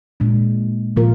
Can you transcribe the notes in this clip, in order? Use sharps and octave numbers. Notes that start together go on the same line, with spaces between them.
A#2 G#3 D4
A#2 F3 A#3 F4 A#4